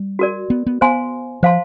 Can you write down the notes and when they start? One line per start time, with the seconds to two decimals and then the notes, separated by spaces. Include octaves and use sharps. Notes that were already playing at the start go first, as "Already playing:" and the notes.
Already playing: G3
0.19 F#4 A#4 D5
0.50 B3
0.66 B3
0.81 B3 C5 F5 G#5 C6
1.43 F3 C5 F5 A5 C6